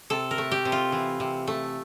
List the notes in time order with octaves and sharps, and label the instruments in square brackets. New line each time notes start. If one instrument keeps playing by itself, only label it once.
[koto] C3 A4
A#4
A3
G4
C3
F4
E3
C3
A3